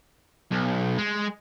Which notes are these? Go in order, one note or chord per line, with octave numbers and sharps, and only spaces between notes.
B1
G#3